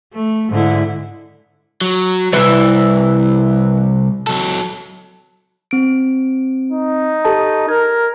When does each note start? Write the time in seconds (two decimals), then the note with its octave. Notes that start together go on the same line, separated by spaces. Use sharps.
0.14 A3
0.50 G#2 D3 E4
1.81 F#3
2.33 C2 E3
4.27 F#3 A4
5.71 C4 D7
6.72 D#4
7.25 G4 A4 A5
7.69 A#4 G#6